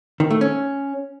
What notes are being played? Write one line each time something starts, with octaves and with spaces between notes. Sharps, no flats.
D#3
A3
C#4